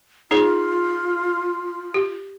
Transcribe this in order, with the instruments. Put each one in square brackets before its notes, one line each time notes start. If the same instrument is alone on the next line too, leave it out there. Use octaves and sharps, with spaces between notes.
[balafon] D#4 G#4 C#5 [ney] F4
[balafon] G4